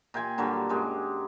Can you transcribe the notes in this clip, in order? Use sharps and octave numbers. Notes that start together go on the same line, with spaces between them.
A#2 G5 G#5 C6
A#2 D3 F#3 G3
F#2 G#3 G4